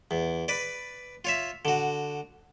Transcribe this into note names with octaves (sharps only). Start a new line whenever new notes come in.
E2
B4 D5
F4 C#5 E5
D3 F#4